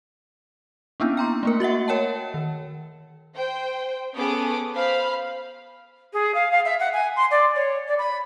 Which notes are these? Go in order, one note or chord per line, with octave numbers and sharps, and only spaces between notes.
A#3 B3 C#4 D4 E4
G5 A#5 C6
A3 A#3 A#4
F#4 D#5 E5 F#5
A#4 C#5 F#5 G5 A5
D#3
C5 G5
B3 C#4 G#4 A4 D6 D#6
C5 F5 B5
G#4
F5
F5
E5
F#5
G#5
C6
D5
C#5
D5
B5